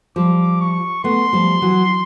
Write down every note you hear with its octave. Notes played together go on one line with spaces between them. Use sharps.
F3 G3 D6
C#6
A3 B3 C6
F3 G3
E3 F#3